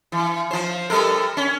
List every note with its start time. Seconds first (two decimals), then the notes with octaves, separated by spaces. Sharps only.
0.12 E3
0.51 F3 C5
0.90 G3 A4 A#4
1.37 C#4